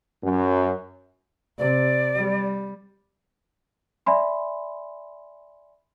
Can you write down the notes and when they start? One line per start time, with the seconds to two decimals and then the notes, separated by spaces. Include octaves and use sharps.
0.23 F#2
1.59 C3 D5
2.16 G3
4.06 D5 E5 G#5 B5 C6